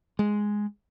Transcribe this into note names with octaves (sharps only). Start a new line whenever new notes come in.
G#3